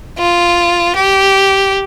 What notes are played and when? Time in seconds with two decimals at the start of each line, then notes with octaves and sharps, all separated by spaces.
0.19 F4
0.95 G4